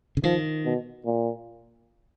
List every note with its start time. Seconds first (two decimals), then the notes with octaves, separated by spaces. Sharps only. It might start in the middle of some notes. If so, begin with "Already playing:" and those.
0.17 C#3
0.23 D#3 F3
0.65 B2
1.06 A#2